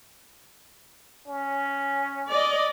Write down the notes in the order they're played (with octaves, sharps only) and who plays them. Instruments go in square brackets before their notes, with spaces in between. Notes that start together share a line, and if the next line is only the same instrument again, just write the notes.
[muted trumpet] C#4
[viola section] D5 D#5